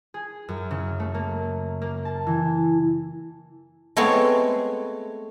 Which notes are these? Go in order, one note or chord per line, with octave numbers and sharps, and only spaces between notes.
G#4
F#2
C#3
A3
A#3
A#3
A5
E3
G#3 A3 B3 C4 C#5